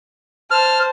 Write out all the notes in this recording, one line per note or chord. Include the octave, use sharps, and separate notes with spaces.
C5 A5 F6